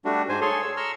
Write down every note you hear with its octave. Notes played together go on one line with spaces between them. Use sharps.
G3 A3 D4 F#4
G#2 C5 G#5
G#4 A4 C#5 G#5 C6
E6
A#5 C6 C#6 E6 F6